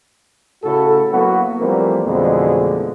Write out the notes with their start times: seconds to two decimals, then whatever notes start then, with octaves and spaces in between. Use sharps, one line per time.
0.64 A2 C#3 E4 F#4 A4
1.12 F#3 A#3 B3 E4 F#4
1.60 E3 F3 G3 A3 A#3 C4
2.06 F2 B2 D3 E3 G#3 A3